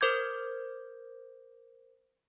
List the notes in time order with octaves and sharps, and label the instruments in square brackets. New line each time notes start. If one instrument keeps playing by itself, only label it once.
[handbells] A#4 C5 D6 G6 G#6